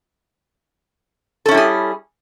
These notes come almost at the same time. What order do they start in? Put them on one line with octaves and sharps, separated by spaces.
A4 C#4 E4 G3 G#4